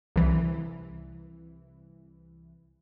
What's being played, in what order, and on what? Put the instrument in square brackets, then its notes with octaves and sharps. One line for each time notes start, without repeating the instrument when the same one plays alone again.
[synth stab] C2 E3